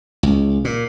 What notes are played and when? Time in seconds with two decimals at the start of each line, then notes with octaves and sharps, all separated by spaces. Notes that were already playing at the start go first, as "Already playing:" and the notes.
0.23 C#2
0.65 A#2